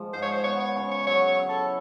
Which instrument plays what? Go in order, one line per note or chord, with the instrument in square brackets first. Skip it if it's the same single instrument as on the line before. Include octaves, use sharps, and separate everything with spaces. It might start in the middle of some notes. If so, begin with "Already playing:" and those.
Already playing: [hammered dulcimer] F3 G#3
[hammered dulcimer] G#2 [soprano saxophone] C5
[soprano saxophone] C#5
C5
[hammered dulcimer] B3 [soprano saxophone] C#5
[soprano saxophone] C#5
[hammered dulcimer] C#3 [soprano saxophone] C#5
[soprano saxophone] C#5
[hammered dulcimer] F#3 [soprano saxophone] C#5
[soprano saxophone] C#5
[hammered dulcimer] E4
[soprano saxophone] A4